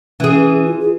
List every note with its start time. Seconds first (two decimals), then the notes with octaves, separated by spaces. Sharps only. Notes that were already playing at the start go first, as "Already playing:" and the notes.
0.20 E3 C#4 G#4
0.66 F4
0.80 G#4